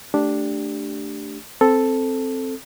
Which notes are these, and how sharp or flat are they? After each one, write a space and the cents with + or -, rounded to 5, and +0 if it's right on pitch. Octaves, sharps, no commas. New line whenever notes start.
A3 +0 D4 +0 G4 +0
C4 +0 A4 +0